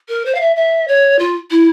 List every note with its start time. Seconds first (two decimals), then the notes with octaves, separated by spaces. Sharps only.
0.08 A#4
0.25 C5
0.34 F5
0.40 E5
0.56 E5
0.87 C#5
1.18 F4
1.50 E4